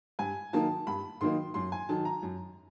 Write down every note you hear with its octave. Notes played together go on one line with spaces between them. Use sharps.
G2 G#5
D#3 F#3 A#3 D#4 A5
G2 B5
D#3 F#3 A#3 D#4 C6
F#2 C6
G#5
D#3 F#3 A5
A#5
F#2